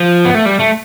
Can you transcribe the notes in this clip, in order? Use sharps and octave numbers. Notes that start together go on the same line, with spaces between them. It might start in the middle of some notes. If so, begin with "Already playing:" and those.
Already playing: F3
B3
A3
G3
A3